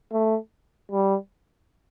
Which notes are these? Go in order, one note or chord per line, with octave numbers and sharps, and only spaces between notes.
A3
G3